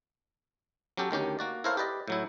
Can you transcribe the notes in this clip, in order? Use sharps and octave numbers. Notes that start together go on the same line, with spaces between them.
F#3 C#4 G4 A4
D2 D#3 C#4 G4
A#3 F#4 D5
E4 A4 A#4 C5 C#5 F5
G4 B4 D5 D#5
A2 F#3 E4